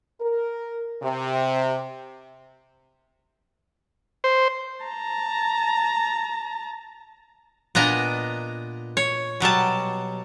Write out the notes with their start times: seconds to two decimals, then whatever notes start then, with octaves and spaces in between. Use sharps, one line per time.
0.21 A#4
1.02 C3
4.24 C5
4.84 A5 A#5
7.75 A#2 B3 D4 D#5 A#5
8.97 C#5
9.40 B2 F#3 G3 A5